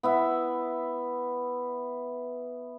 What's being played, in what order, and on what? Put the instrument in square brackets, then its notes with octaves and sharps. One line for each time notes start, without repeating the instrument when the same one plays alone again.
[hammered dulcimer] B3 E4 E5